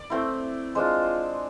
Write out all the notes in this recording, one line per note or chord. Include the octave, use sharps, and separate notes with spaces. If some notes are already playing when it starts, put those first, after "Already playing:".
Already playing: D5
A3 C4 E4
G#3 D4 F4 C5